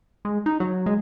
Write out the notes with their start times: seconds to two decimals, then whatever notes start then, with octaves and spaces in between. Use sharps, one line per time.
0.25 G#3
0.46 D#4
0.60 F#3
0.86 G#3